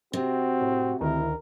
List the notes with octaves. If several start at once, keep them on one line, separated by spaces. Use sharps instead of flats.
C3 C4 F#4
A2
D2 D#3 E4 A#4